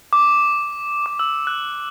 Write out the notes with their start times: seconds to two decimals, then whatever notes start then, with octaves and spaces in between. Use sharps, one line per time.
0.13 D6
1.06 D6
1.19 E6
1.47 F#6